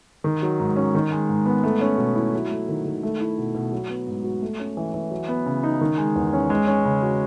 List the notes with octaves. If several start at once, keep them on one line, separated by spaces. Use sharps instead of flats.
D#3
F#3
G#2
C#4
D#3
G#3
G#2
B3
A3
C#4
B2
E4
F#3
A3
D#3
D#3
A3
E4
B2
B2
F#3
B3
G#2
F#4
A3
C#4
E3
E3
F#3
B3
C#3
D#4
D#3
G#3
E2
C#4
G#3
C#4
C#3
F#4